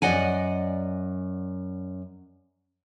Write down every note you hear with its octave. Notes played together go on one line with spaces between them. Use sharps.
F#2 D#3 D5 D#5 F#5 G#5